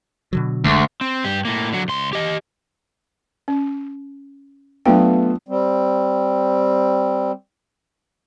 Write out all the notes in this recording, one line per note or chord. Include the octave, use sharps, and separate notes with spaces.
B2 D3 F#3
F1 D2 G#3 A3
C4
G2 G4
A2 A#3
D3 F#3
C#2 C6
G4 D#5
C#4
F#3 A3 B3 D4 F4 G5
G3 C4